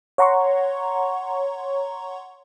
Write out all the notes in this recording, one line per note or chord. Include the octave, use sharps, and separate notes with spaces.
C#5 F#5 A#5 C6 C#6